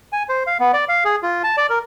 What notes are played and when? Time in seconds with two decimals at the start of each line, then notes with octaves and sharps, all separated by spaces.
0.12 G#5
0.29 C5
0.47 F5
0.59 B3
0.73 D5
0.89 F5
1.05 G#4
1.23 F4
1.44 A5
1.57 D5
1.70 A#4